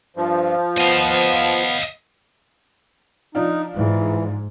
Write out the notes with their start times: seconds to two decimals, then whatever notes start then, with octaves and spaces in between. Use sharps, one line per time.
0.16 G2 F3
0.78 B3 D#5 F5
3.35 F3 D4 D#4 F4
3.75 G#2 E3